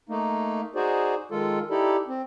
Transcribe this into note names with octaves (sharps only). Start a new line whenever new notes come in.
A3 A#3 D#4
D#4 F#4 G#4 C5 D5
D#3 G#3 F4 A4
D#4 E4 G4 A4 D5
C4